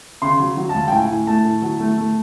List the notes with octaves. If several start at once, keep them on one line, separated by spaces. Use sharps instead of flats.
C#3 C6
F#3
F#3
A5
C#2
G5
A2 G#5
A2
A3 A5
A2
F#3
A3
A3